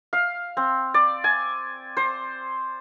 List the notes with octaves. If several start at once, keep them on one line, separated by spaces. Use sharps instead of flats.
F5
C4
D5
G#5
C5